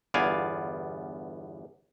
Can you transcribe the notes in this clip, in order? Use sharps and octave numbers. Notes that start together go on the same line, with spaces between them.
G1 E2 B3 D5 F5 G#5